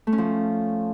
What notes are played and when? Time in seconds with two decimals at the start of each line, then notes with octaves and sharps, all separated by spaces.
0.07 A3
0.13 C#4
0.18 F3